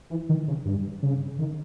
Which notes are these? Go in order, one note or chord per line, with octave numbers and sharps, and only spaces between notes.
E3
D#3
C#3
G2
C#3
D#3